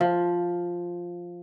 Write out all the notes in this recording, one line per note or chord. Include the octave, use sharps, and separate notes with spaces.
F3